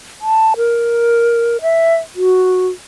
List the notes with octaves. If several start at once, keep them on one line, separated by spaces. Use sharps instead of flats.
A5
A#4
E5
F#4